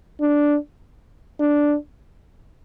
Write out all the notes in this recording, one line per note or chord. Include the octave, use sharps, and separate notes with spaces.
D4
D4